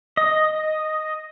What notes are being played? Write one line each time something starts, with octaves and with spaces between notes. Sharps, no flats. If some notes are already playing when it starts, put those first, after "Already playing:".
D#5